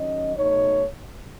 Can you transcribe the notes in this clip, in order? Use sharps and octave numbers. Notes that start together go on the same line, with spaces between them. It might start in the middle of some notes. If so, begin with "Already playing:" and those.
Already playing: D#3 F#3 C#4 D#5
B2 A3 D#4 C#5